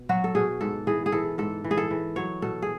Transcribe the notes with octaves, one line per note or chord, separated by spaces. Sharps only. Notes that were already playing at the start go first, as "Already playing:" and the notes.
Already playing: B2
F#3 F#4
A4
B2 G#4
G#2 A4
E3 G#4
G#4
E3 A4
G#2 A4
E3
G#4
A4
E3
F#3 C#5
B2 A4
G#4